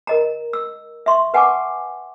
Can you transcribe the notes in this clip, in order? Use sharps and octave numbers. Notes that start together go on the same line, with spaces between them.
A#4 D#5 A#5
E6
E5 C6 C#6
B4 F#5 G#5 A5 C#6 D6